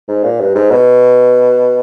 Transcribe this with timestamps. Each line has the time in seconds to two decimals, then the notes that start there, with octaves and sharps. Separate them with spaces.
0.08 G#2
0.23 A#2
0.40 G2
0.55 G#2
0.71 B2